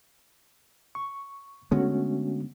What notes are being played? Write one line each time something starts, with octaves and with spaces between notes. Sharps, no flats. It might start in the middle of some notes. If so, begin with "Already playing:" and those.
C#6
D3 G#3 A3 B3 C#4 F#4